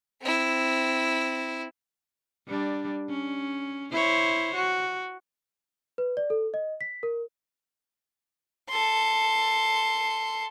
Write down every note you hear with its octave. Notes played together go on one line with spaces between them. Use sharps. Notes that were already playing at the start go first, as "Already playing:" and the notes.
C4 E4
G3 D4
C#4
E4 C5 C#5
F#4
B4
D5
A4
D#5
B6
A#4
A4 C6